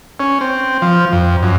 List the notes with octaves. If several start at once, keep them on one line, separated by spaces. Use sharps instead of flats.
C#4
C4
F3
F2
F#2